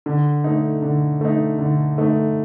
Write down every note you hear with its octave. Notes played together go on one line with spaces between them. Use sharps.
D3
A3 D#4
D3
A3 D#4
D3
A3 D#4